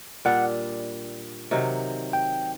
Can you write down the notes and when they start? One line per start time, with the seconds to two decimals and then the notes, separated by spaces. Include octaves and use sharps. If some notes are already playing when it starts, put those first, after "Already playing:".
0.25 A#2 G3 D4 F#5
1.51 C3 D#3 F#3
2.13 G5